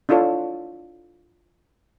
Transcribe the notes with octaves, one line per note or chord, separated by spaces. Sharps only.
D4 E4 F4 A4 C#5